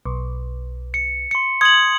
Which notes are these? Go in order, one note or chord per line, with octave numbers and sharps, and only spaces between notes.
B1
C#7
C6 C#7
C6 D#6 G#6 F#7